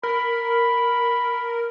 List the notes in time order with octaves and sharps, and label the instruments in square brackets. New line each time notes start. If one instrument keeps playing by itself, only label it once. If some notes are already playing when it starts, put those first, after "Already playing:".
[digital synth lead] A#4 [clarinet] B5